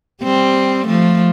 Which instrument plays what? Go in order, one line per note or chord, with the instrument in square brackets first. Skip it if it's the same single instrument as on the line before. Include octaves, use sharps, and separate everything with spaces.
[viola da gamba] G3 C4
F3 A3